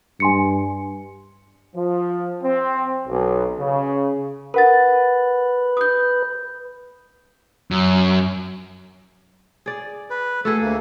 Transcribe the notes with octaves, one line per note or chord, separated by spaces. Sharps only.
G2 G#5 C6 C#7
F3
C4
B1
C#3
A#4 B4 F#5 A6
D#6 G6
F#2
G#4 D5
B4
A3 F#4 G#4 A4
D2 A#3